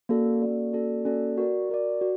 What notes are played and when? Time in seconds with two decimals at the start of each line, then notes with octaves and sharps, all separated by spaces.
0.09 A#3 C#4 F#4 A4 D5
0.42 A#3 C#4 F#4 A4 D5
0.73 A#3 C#4 F#4 A4 D5
1.05 A#3 C#4 F#4 A4 D5
1.37 F#4 A#4 D5
1.70 F#4 A#4 D5
2.01 F#4